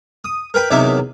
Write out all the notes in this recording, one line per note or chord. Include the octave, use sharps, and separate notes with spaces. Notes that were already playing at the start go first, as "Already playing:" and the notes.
D#6
A#4 B4 G5 B5
E2 C3 D#3 F#3 E5 D6